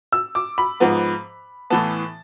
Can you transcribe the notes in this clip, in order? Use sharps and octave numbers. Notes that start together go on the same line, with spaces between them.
E6
D6
B5
G#2 F3 B3
A2 E3 B3 A5